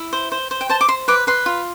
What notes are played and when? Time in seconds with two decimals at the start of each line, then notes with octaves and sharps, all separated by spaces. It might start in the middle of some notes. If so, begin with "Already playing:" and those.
Already playing: E4
0.13 C5
0.32 C5
0.51 C5
0.61 G5
0.69 C5 A5
0.81 D6
0.88 C5 C6
1.08 B4 D6
1.27 B4 C6
1.46 F4